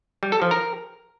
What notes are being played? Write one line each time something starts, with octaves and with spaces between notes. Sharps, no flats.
G3
A4
F3
A#4